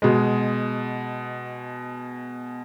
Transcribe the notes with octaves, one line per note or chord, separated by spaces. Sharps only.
B2 G#3